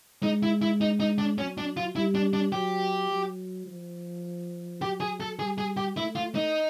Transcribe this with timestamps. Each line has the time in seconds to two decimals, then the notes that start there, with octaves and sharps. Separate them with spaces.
0.23 G#3 D#4
0.43 E4
0.62 E4
0.81 D#4
1.00 D#4
1.18 D4
1.38 F#3 C#4
1.58 D4
1.77 F4
1.96 G3 E4
2.15 D4
2.33 D4
2.52 F#3 G4
3.10 F#3
3.67 F3
4.82 F#3 G4
5.00 G#4
5.20 A4
5.39 G3 G#4
5.58 G#4
5.77 G4
5.96 A3 E4
6.15 F4
6.35 D#4